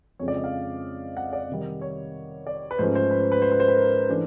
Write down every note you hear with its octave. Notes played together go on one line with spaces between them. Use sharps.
F2 C#3 F3 G#3 C4 C#5
D5
D#5
F5
F#5
D5
C3 D#3 G3
C#5
D5
B4
G#2 F3 A3 C#4 C5
C5
B4
C5
B4
C5
B4
C5
B4
A#4
E3 A3 D4